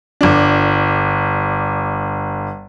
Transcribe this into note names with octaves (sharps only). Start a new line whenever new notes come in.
G1 D4